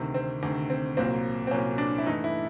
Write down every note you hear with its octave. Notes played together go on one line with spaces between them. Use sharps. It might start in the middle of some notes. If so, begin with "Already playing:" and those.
Already playing: D2 C3 D#3
C4
D2 C3 D#3
C4
C2 A#2 F#3 A#3 C4
C4
C2 A#2 F#3 A#3 C#4
D4
E4
G2 E3 A3 D#4
E4